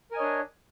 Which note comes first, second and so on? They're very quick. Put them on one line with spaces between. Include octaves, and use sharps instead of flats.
A#4 G#5 D#5 C#5 D4